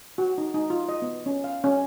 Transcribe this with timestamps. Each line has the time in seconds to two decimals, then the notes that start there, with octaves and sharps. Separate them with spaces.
0.18 F#4
0.38 D#4
0.54 D#4
0.70 F4
0.89 D#5
1.02 B3
1.26 C#4
1.44 F5
1.64 C#4